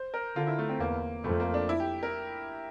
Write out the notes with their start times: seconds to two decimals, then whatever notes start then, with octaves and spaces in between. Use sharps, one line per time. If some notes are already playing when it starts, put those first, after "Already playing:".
Already playing: C5
0.14 A#4
0.36 D3 F4
0.47 E4
0.59 A3
0.69 C4
0.80 E2 A#3
1.24 F2 A3
1.40 A#3
1.54 D4
1.69 E4
1.80 G4
2.03 A#4